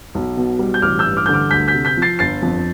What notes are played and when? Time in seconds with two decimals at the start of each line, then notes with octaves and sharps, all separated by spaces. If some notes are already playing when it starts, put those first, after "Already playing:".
0.15 B1
0.37 B2
0.59 G3
0.74 G6
0.82 A1 D6 F6
0.99 E6 G6
1.05 G2
1.17 D6 F6
1.26 D3 G6
1.34 D6 F6
1.51 D2 G6 B6
1.68 G6 B6
1.74 C3
1.85 G6 B6
1.97 F3
2.02 A6 C7
2.19 G1 A6 C7
2.42 F2